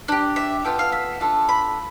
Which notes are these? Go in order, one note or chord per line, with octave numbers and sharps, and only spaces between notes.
D4 G4
E5
B3 F4 A4 G5
F5
E5
D4 F4 A4
B5